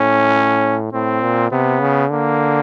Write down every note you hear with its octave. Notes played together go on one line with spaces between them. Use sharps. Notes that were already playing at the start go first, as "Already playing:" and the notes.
Already playing: A2 C#4
A2 C4
A#2
C3 B3
C#3
D3 A#3